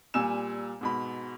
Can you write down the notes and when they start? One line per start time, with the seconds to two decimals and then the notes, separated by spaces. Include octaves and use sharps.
0.14 A#2 G3 G#5 E6 E7
0.81 G#2 B2 B5